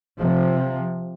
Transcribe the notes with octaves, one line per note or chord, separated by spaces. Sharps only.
C3 F3